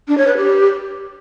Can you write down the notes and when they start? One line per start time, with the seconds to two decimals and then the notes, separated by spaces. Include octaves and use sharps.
0.08 D4
0.18 C#5
0.27 B4
0.37 G4